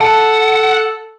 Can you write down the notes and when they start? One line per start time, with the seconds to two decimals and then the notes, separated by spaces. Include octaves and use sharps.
0.01 A4 F#5 A5